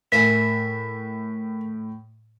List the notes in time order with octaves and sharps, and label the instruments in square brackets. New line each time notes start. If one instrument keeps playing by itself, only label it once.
[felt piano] A2 [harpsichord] A#4 E5 G#5 [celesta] B6